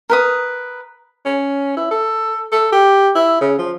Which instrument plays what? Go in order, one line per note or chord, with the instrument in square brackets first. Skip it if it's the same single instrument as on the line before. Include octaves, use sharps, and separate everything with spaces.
[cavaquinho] A#4 B4 D#6
[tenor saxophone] C#4
E4
A4
A4
G4
E4
C#3
F3